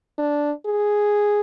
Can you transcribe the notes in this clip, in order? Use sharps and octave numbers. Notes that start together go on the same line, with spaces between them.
D4
G#4